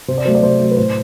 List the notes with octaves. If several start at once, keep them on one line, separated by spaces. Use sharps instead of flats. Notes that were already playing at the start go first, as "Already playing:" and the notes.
C3 C5
D5
F#3 A3 C5
D5
C3 C5
F#3 A3
B4
A2 C5